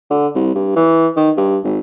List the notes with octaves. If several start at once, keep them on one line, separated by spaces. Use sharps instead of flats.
D3
C2
G2
E3
D#3
G2
G#1